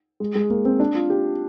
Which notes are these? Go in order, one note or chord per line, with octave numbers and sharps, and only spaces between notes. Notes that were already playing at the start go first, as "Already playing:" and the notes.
G#3
G#3
A#3
C4
D4
F4
G4